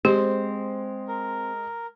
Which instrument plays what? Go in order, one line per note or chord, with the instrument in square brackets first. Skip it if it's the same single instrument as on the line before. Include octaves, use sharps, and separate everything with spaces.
[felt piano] G#3 [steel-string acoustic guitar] C4 C5 [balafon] G4
[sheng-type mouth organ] A#4